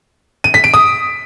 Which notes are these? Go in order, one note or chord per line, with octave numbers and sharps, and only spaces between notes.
D#7
B6
D7
D#6